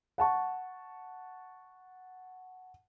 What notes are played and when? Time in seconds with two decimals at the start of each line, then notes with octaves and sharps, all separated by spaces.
0.18 F#5 A5 C#6